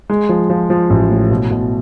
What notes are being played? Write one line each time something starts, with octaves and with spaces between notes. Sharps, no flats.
G#3
F3
F3
F3
A1
A2
B2
B2